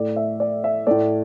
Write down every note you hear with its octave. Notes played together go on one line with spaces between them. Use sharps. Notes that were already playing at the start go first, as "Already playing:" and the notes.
Already playing: A2 A3 D5
E5
D5
E5
A2 A3 D5